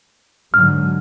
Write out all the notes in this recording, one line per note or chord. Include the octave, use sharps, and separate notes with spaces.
G#2 D3 F#3 F6